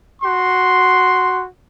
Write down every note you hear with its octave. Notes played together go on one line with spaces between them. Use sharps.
F#4 C6